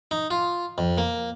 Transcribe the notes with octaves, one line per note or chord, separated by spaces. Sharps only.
D#4
F4
F2
A#3